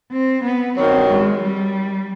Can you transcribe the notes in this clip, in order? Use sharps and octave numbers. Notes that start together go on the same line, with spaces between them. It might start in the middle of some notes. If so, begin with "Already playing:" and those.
C4
B3
G2 D#3 F#3 C4
G#3
G3